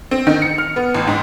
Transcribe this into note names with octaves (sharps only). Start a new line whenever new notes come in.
C4
D#3
C#7
F6
B3
A1
G#2